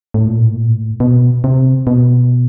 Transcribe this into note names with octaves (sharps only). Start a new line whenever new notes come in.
A2
A#2
A2
A#2
A2
B2
C3
B2